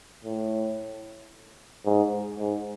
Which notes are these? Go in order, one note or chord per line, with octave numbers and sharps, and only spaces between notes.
A2
G#2
G#2